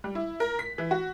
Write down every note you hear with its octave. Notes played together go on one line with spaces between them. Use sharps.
G3
E4
A#4
B6
E3
F#4